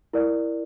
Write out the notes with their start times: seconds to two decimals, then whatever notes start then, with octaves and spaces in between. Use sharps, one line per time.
0.13 E4 A#4 D5